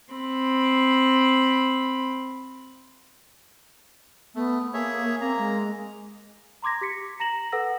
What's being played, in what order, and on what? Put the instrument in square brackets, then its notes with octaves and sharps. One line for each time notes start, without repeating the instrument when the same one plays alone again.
[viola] C4 B5
[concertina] A3 [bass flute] B3
[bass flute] A#3 [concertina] G#4 C#5 E5
[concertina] A#3 A#5 [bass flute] C4
[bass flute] G#3
[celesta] A#5 C6 D6 G#6 A#6
G4 B6 C#7
A#5 A#6 E7 F#7
A4 B4 F#5 E6 A#6